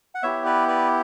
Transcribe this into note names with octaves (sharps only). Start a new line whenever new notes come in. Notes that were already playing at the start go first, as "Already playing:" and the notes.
F#5
B3 E4 G4 C#5 E5
B4 D5
B4 D5